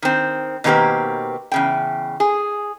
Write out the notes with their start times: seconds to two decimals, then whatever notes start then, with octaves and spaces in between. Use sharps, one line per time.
0.02 D#3 C4
0.64 B2 D#3 A#3 C4 G4 B4
1.52 E2 C#3 G5
2.20 G#4